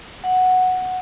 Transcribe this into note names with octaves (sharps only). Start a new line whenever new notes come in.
F#5